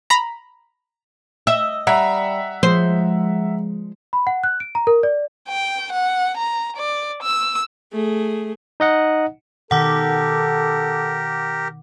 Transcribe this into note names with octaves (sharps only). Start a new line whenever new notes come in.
A#5 B5
D#5 E5
G3 E5 F#5 A#5
F3 G#3 C5
B5
F#5
F#6
D7
A#5
A#4
D5
G5
F#5
A#5
D5
E6
A3 G#4
D#4 D#5 F#5
B2 D#3 G4 A4 A#4 F#5 D6